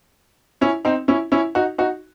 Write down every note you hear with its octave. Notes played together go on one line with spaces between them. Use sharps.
C#4 E4
C4 D#4
C#4 E4
C#4 E4
D#4 F#4
D#4 F#4